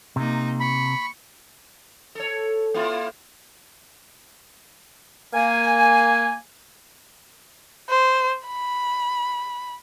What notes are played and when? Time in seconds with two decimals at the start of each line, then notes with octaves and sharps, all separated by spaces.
0.16 C3 A#3 D#4
0.60 B5 C#6
2.15 A4 C#5
2.74 A#3 E4 F4
5.33 A#3 G#5
7.89 C5
8.47 B5